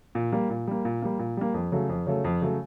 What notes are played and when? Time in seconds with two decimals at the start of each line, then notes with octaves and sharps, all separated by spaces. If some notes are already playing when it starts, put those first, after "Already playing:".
0.15 A#2
0.32 G3 A#3
0.50 A#2
0.67 G3 A#3
0.85 A#2
1.02 G3 A#3
1.19 A#2
1.37 G3 A#3
1.54 F2
1.72 C#3 F#3 A3
1.89 F2
2.07 C#3 F#3 A3
2.24 F2
2.41 C#3 F#3 A3